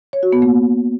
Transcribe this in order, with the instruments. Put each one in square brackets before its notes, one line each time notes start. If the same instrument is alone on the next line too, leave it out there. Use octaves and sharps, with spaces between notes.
[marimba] C#5
F#4
B3
A#3